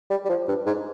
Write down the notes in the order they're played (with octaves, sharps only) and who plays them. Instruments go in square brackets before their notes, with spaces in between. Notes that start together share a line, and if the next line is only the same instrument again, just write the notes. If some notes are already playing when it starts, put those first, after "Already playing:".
[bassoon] G3
G3
F3
G2
G#2